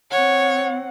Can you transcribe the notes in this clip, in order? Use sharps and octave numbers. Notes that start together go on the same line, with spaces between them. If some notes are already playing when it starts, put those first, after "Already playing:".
C4 C#5 F#5